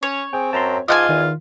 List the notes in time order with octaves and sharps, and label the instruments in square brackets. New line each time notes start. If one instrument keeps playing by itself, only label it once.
[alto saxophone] C#4 [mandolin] C#5
[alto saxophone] C4 [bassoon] G#4 [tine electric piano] G5
[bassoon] F#2 [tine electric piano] A5 A#5 C6
[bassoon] G#2 [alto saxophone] F4 [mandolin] D#5 F#5 G#5 [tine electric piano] A5 C6 D6
[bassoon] E2 [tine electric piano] D#3